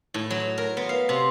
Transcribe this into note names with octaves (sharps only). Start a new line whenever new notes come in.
A2
F#3
A#4
B3
F5
C3